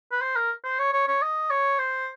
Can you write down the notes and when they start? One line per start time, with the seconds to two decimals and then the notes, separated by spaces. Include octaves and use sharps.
0.12 B4
0.22 C5
0.36 A#4
0.64 C5
0.79 C#5
0.93 C#5
1.08 C#5
1.22 D#5
1.50 C#5
1.78 C5